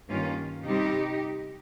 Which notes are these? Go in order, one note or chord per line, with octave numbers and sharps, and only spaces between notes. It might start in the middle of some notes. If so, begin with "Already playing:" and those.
G2 D#3 A#3 C#4 F4
C3 G3 C4 D#4 G4